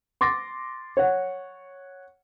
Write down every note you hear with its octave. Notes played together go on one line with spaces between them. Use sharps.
C6 D6 A6 A#6
C#5 F#5